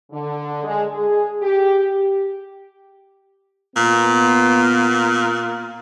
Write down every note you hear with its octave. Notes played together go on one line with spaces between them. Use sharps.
D3
G#3
G#4
G4
A#2 B3